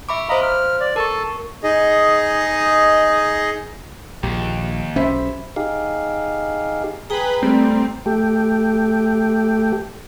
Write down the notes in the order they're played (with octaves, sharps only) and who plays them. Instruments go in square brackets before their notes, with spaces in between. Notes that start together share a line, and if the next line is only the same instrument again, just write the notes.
[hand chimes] E5 B5 D6 [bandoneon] C#6
[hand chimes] C5 F5 [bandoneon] D#5 A#5 B5
[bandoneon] F6
D5
[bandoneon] A4 A5 [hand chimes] A#4 C#6
[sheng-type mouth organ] D#4 G#4 D#5
[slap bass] A#1 [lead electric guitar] D#2 [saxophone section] G4
[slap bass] B1 C#4 [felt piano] C5 E5 B5
[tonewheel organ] D#4 G4 G#4 F5
[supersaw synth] G#4 B4 B5 [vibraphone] G5 A#5
[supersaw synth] G3 [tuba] A3 [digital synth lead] C4
[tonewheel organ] A3 G4